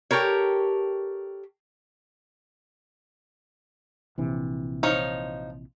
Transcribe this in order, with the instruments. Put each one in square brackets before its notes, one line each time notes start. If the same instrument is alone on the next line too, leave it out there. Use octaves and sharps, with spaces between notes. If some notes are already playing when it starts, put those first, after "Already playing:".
[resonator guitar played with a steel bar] G4 A4 A#4 C#5
[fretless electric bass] A#1 C3 E3
[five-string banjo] F3 D#4 C#5